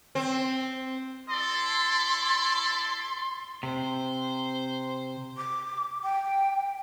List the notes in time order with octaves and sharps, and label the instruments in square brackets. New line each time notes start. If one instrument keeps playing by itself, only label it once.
[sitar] C4
[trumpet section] E4 A4 D5 [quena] C6
[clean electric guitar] C3 [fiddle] C5
[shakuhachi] D6
G5